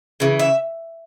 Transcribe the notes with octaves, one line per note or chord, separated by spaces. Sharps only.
C#3 E3
E5